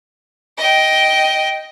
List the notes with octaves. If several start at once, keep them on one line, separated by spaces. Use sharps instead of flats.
D#5 G5